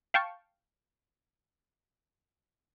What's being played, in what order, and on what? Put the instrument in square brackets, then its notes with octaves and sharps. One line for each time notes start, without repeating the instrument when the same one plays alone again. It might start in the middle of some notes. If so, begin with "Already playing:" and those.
[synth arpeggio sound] F5 G5 A5 C#6